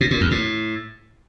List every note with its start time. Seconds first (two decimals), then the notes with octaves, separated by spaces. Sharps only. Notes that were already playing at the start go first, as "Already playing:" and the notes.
0.01 B2
0.11 A#2
0.21 E2
0.31 A2